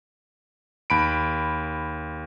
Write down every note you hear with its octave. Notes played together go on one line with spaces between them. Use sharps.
D#2 B5 D7